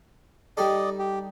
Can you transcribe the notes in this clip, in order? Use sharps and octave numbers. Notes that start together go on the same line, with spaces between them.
G3 D#4 A4 D5 D#5
G4